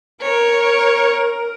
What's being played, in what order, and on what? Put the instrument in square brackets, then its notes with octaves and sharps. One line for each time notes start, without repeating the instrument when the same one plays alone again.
[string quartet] A#4 [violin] C#5